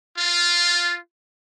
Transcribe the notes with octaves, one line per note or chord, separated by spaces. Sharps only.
F4